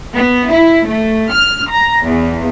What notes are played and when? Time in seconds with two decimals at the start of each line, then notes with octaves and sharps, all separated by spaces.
0.14 B3
0.50 E4
0.87 A3
1.30 F6
1.71 A#5
2.06 E2